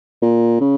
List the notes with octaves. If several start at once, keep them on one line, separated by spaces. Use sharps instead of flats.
A#2
C#3